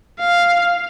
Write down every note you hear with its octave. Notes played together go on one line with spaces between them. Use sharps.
F5